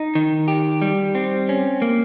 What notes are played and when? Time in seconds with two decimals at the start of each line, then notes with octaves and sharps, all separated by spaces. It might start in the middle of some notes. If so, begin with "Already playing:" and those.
Already playing: D#4
0.15 D#3
0.48 G4
0.82 G3
1.15 C4
1.49 C#4
1.82 A#3